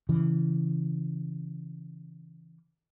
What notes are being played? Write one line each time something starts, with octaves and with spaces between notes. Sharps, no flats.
C#3 E3